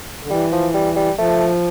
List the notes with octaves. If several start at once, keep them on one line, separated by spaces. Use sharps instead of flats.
D3
E3 G3
F3
G3
G3
F3 A3